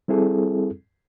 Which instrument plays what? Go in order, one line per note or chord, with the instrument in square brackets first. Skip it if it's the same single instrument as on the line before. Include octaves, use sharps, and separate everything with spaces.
[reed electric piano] G3 C4 E4 G#4 A4